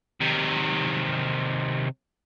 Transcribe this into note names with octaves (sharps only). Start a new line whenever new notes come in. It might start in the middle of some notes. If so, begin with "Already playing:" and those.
C3 D#3